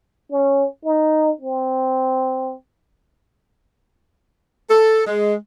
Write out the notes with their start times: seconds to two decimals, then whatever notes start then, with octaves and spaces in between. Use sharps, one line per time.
0.31 C#4
0.85 D#4
1.41 C4
4.70 A4
5.06 G#3